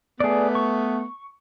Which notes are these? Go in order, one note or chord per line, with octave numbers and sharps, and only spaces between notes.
A3 B3 G#4 D5
C#6